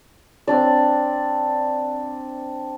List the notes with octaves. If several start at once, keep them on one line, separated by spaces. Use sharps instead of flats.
C4 D4 D5